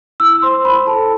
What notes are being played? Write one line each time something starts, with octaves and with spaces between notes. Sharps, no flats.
E4 E6
C5 C6
E4 B5
A4 A5